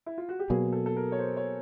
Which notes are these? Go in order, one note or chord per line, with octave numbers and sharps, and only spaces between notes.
E4
F4
F#4
G4
B2 F#3 A#3 G#4
A4
A4
A#4
C#5
C5
C#5